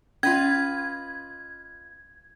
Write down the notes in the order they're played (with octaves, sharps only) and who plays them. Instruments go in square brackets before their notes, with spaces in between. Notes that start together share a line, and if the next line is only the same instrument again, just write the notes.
[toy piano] C#4 [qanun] F4 B4 D#5 [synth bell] G#6